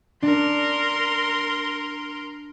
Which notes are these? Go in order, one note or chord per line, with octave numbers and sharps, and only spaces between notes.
D4 A#4 C6